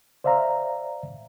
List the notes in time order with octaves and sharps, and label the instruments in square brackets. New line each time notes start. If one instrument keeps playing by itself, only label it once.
[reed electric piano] C5 D5 E5 F5 A#5